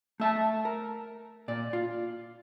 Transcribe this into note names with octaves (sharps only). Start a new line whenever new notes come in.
A3 E5 A5
A#4
A#2 D5
F4